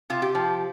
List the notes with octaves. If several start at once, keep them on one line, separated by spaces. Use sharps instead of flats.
C3 F4
G4
F3